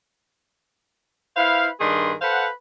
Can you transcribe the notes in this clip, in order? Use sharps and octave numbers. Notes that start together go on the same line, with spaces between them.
E4 B4 C5 F5
G2 D#3 D4 G#4 B4 C6
A4 B4 C5 F5 F#5